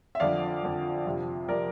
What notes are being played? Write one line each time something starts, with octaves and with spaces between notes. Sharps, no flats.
E5
F2 D3 F3 D5 F5
F2 D3 F3
F2 C3 F3
C3 F3 A#4 D5